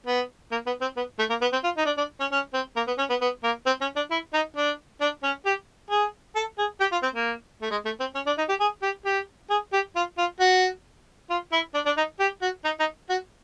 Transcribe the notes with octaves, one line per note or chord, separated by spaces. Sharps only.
B3
A#3
B3
C4
B3
A3
A#3
B3
C4
F4
D#4
D4
D4
C#4
C#4
C4
A#3
B3
C#4
B3
B3
A#3
C4
C#4
D4
E4
D#4
D4
D4
C#4
G4
G#4
A4
G#4
G4
F4
C4
A#3
A3
G#3
A3
C4
C#4
D4
D#4
G4
G#4
G4
G4
G#4
G4
F4
F4
F#4
F4
E4
D4
D4
D#4
G4
F#4
D#4
D#4
F#4